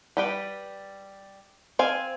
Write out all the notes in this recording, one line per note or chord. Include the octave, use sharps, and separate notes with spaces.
G3 B4 G5
C4 F5 G#5